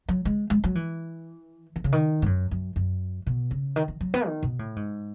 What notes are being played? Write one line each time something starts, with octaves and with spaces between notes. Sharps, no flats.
F#3
G#3
G#3
F#3
E3
D#3
C#3
D#3
G#2
F#2
F#2
F#2
B2
C#3
D#3
D#3
F#3
B3
D#3
B2
A2
G#2